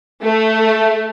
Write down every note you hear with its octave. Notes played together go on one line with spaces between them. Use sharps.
A3